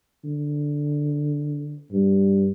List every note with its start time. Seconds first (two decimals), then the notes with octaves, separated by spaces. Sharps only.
0.24 D3
1.91 G2